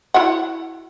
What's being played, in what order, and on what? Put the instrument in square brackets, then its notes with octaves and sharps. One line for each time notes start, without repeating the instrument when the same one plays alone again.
[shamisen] E4 F#4 F#5